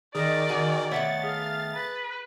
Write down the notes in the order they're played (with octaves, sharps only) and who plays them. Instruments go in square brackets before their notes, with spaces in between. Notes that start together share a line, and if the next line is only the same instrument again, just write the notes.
[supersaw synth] D#3 [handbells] G#4 A#4 D#5 [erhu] D5
[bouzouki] F#4 F#5 G#5
[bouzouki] D#3 A3 B3 [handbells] C#5 E5 F#5 [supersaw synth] A6
[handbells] G#4 [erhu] F5
[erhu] B4